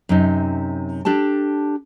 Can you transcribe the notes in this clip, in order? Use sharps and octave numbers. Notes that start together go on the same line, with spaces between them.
F#2 C3 D#4
D4 G4 A4 A5